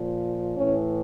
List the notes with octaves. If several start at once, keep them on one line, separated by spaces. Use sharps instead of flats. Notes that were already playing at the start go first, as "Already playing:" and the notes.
Already playing: A#2 F3
A2 E3 C#4